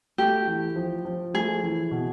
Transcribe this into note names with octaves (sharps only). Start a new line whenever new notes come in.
A3 G4
E3
F3
F3
A3 G#4
E3
B2